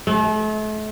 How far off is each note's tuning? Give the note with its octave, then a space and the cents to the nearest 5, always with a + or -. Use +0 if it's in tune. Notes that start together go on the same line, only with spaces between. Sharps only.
A3 -40